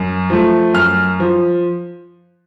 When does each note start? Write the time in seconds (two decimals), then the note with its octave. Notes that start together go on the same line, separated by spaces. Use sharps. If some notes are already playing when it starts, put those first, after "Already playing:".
Already playing: F#2
0.30 F3 A3
0.74 F#2 F6
1.20 F3